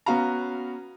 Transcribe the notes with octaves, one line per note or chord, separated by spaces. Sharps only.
B3 C#4 F#4 F5 A#5